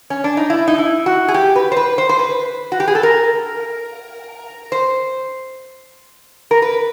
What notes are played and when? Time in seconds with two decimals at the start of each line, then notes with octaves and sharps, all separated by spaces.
0.10 C#4
0.24 D4
0.37 D#4
0.50 E4
0.68 D#4
0.78 E4
1.06 F#4
1.28 G#4
1.34 G4
1.56 B4
1.72 C5
1.77 B4
1.98 C5
2.09 C5
2.19 B4
2.72 F#4
2.80 G4
2.88 G#4
2.95 A4
3.03 A#4
4.72 C5
6.51 A#4
6.62 B4